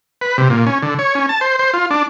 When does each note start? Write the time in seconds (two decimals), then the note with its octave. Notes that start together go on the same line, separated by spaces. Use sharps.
0.21 B4
0.38 C3
0.50 A#2
0.67 C#4
0.83 D3
0.99 C#5
1.15 C#4
1.29 A5
1.41 C5
1.59 C5
1.74 F4
1.91 D4